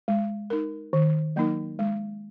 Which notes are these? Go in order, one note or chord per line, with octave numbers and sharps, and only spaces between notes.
G#3
D#4 A#4
D#3
F#3 A#3 D#4 A#4
G#3